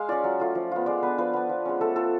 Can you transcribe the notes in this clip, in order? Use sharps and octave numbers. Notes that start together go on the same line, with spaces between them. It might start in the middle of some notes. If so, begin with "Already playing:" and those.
Already playing: G#3 F5
C#4 F4 D5
F#3
A3 F4
F3
B3 F4
G#3 D5
B3 D4 B4
F3 B4
B3 D4
F3
G#3 C#4
A3 A4
F4 A4